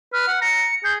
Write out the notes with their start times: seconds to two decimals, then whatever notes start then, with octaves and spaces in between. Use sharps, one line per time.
0.13 B4 F6
0.27 F#5
0.41 A#5 C#7
0.84 G#4 G6